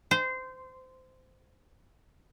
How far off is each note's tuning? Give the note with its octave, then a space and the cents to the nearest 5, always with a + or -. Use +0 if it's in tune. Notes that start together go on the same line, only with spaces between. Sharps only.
C5 -20